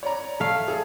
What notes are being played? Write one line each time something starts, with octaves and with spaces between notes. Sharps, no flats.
C#5 D5 A#5
A3 F5
G#4 A4